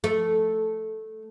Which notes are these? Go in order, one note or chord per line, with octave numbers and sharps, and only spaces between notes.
A3